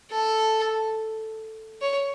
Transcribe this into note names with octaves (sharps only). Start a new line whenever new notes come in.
A4
C#5